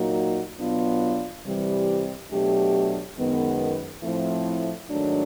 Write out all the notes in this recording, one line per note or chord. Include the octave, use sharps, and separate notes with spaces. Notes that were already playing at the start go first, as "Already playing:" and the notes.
Already playing: A#2 F#3 A#3 D#4 F#4
B2 F#3 B3 D4 F4
C3 E3 G3
B2 F#3 A3 D4 G4
F#2 D#3 G#3 B3
A2 F3 A3 C4 E4
G#2 D#3 F#3 A3 D4